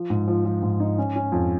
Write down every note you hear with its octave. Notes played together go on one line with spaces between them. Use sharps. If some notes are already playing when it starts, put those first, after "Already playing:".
Already playing: F3
G#2
F3
F3
G#2
D#4
C#4
C#4
F2